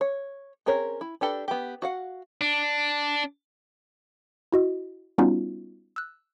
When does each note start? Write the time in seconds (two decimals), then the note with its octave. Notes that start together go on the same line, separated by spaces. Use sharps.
0.01 C#5
0.66 C4 C#4 G#4 A#4 C#5
1.01 E4
1.21 D4 G4 A4 B4
1.48 B3 G4
1.82 F#4 F5 F#5
2.41 D4
4.52 E4 F#4 D#5
5.18 G3 B3 C#4 D#4 F4 F#4
5.96 E6 F#6